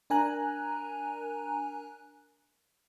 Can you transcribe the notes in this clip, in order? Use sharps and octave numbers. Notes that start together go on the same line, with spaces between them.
D4 A#4 G#5 A#5 F#6